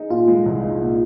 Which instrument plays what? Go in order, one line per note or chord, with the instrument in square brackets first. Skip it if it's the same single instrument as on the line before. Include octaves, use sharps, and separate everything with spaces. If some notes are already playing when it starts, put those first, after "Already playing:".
Already playing: [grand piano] D#4 [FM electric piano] G#4
[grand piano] A#2 [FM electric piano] F4
[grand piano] G#3
C2
D#4
A#2